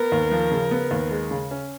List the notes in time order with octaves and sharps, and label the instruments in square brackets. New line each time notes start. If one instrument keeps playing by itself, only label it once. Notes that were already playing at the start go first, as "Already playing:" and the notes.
Already playing: [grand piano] B3 [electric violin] A#4
[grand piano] D#2
F3
C#3
B3
D#2
G#3
C#3
C#4